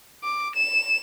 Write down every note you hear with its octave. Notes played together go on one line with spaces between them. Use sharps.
D6
E7